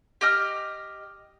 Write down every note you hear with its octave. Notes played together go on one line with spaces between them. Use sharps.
G4 D#5 F6